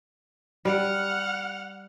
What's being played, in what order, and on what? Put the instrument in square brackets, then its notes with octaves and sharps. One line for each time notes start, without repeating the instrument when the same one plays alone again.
[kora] G3 [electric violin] F#5 F6